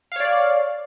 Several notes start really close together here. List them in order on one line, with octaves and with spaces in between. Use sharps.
F5 C#5 D5